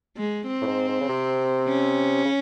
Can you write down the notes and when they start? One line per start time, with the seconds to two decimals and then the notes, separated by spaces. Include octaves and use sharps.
0.17 G#3
0.47 C4
0.62 A2
0.67 G#2
0.89 G#2
1.01 C#3
1.09 C3
1.68 C#4
2.25 C#3